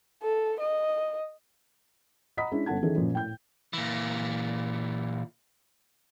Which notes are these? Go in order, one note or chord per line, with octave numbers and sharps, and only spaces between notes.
A4
D#5
D#5 F#5 A#5 B5 D#6 B6
G#3 C#4 D4 E4
G1 C#4 A4 F#5 A5 G#6
D#3 E3 C#4 G#4 A4
F#2 A#2 F3
A2 G5 G6
A#2 E3